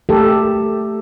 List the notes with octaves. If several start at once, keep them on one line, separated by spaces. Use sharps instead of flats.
A3 G4 A4 A#4